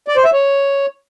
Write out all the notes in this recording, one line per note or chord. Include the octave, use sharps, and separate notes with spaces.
D5
C5
E5
C#5